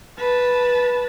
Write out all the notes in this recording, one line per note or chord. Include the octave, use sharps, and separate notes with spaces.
B4 A5